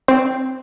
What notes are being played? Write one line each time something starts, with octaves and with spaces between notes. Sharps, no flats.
C4